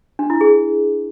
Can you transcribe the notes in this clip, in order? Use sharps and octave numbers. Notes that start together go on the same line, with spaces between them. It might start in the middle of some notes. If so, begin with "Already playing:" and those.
D4
E4
G#4